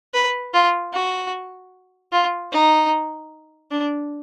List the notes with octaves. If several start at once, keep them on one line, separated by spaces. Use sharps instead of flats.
B4
F4
F#4
F4
D#4
D4